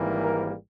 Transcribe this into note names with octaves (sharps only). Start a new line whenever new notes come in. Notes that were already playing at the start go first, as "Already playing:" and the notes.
Already playing: G#1 G#2 E3 G3 A#3
A#4